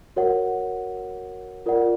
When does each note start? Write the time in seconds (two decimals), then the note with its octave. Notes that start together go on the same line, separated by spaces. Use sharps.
0.16 F#4 A#4 C#5 F#5
1.66 F4 A#4 D5 F#5